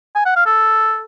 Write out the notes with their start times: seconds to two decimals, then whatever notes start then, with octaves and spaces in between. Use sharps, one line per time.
0.15 G#5
0.26 F#5
0.36 F5
0.46 A4